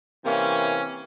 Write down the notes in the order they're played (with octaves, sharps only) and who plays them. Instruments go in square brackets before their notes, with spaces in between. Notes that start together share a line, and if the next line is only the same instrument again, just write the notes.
[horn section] C3 E3 A#3 C#4